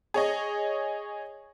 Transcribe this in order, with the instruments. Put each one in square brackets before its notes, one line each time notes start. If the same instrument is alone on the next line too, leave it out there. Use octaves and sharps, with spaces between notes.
[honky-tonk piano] G#4 C#5 D#5